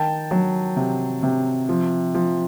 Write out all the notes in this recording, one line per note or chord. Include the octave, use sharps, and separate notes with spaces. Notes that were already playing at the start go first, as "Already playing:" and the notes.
Already playing: D#3 G5 A5
F#3
C3
C3
F3
F3